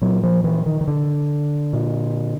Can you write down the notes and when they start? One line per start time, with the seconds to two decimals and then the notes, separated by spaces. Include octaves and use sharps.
0.02 A#2 F#3
0.23 F3
0.44 E3
0.66 D#3
0.81 D#3
0.88 D3
1.73 A#2